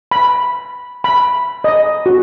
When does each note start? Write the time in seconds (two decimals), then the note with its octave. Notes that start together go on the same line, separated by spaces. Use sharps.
0.11 B5
1.04 B5
1.64 D#5
2.06 F#4